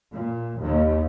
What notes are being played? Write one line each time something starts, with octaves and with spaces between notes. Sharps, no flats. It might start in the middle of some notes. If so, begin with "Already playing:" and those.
A#2
D#2